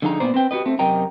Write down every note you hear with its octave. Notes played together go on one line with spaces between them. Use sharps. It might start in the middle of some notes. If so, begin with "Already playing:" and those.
D3 F3 D#4 G#4 F#5 A#5
A#2 B3 C5 D5
C4 B4 G5
F#4 G4 B4 D#5
A3 C4
F#2 C3 A#4 D#5 G5 A#5